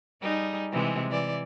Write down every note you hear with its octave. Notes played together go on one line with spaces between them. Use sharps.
G3 D#4 G#4
C3 E3 G#3
E3 D5